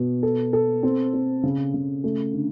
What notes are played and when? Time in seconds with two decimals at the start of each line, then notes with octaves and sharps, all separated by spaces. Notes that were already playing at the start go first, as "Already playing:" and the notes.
Already playing: B2
0.23 A4
0.53 A4
0.83 C4
1.13 C4
1.43 C#3
1.74 C#3
2.04 A3
2.34 D3